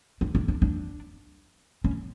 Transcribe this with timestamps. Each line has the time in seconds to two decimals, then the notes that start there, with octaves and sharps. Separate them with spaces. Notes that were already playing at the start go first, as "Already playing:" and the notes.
0.21 D4
0.35 D4
0.48 D4
0.62 D4
1.84 C#4